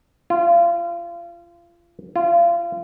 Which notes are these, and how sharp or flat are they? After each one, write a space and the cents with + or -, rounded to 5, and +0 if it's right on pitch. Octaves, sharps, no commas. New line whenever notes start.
F4 -30
F4 -30